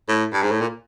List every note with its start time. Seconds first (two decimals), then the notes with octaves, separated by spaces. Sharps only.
0.09 A2
0.33 G2
0.43 G#2
0.52 A2
0.61 A#2